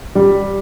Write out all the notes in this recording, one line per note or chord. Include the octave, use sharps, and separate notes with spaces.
G3